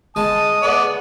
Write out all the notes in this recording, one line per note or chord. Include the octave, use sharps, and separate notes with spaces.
G#3 A5 D#6
A3 B3 D5